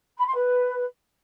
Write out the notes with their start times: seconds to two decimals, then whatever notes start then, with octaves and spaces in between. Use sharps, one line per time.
0.18 B5
0.26 C6
0.35 B4